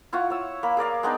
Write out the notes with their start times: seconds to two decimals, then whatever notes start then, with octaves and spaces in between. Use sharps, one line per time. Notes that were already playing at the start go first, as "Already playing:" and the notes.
0.13 E4 F4 F#5 C#6
0.30 C#5 E6
0.63 A#3 B5
0.77 G#4 A#4 D5 F5
1.03 G#3 B3 D4 D#4